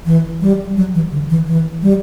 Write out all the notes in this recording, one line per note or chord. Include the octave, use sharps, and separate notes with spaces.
E3
G3
F#3
E3
D3
E3
E3
G3